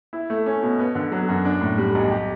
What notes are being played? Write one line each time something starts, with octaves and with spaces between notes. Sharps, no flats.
E4
A3
C#4
B2
B3
D3
F#3
F#2
D4
A2
G3
B1
G4